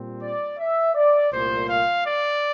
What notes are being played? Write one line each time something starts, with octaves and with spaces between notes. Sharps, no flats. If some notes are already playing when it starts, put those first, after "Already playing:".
Already playing: A#2 G3 C4
D5
E5
D5
C2 A#2 A3 C5
F5
D5